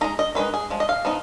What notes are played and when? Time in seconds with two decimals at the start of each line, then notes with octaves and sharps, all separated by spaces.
0.01 G#3 D#4 A#5
0.19 D#5
0.35 D#3 G#3 D#4 B4
0.54 G#4
0.70 F3 G#3
0.80 D#5
0.89 F5
1.05 F3 B3 D#4